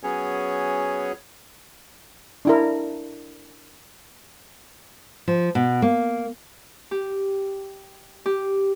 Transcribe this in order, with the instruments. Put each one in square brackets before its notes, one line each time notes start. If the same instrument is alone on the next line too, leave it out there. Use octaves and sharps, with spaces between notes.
[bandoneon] F#3 B3 C#4 G#4 C#5
[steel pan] D4 E4 A#4
[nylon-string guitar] F3
B2
A#3
[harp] G4
G4